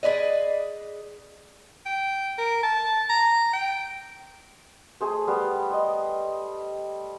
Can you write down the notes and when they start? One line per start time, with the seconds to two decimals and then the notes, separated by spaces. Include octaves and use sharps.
0.03 G#4 B4 D5 D#5
1.86 G5
2.38 A#4
2.63 A5
3.10 A#5
3.53 G5
5.01 A3 G#4 C5
5.27 G3 B3 C6
5.71 C5 D#5